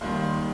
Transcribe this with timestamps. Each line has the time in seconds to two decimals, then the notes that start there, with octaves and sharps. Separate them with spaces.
0.01 D#2 D#3 G3 C6
0.23 C6